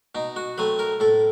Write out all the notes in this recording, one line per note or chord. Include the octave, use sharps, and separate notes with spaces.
B2 D#4
F#4
F#3 A3 C4 B4
A#4
A2 A4